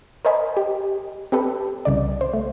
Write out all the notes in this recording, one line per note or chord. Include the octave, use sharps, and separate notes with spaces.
A#4 C5 C#5 D#5 G#5 B5
G4
C4 G4 A4 B4
C2 C#3 D5
C5
A3